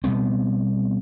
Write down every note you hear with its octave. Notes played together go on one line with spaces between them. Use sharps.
B2 G3 B3 C4